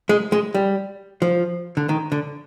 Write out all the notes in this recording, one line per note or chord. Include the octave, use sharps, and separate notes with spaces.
G#3
G#3
G3
F3
D3
D#3
D3